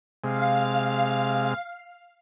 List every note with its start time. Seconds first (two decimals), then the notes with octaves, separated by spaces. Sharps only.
0.24 C3 G#3 F5